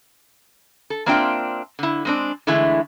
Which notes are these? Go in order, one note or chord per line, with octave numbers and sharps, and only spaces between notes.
A4
A#3 C4 D4 F4 E5 G5
D3 E4
G#3 C4 D4
D3 E3 G#3 A3 E4